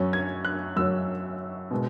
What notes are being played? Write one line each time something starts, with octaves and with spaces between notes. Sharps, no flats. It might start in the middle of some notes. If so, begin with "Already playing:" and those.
Already playing: F#2 F#3 C#4
G#6
F#6
F#2 F#3 C#4 E6
B2 G#3 B3